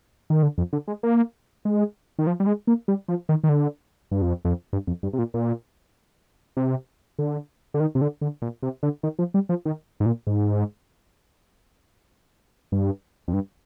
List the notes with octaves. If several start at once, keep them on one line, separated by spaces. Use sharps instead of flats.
D#3
D3
F2
D3
G#3
A#3
G#3
D#3
F3
G3
G#3
A#3
G3
F3
D#3
D#3
D3
G2
F2
F2
G2
F2
G2
C3
A#2
A#2
C3
D3
D3
D#3
C3
D3
D3
A#2
C3
D3
D#3
F3
G3
F3
D#3
G#2
A#2
G#2
G2
F2
G2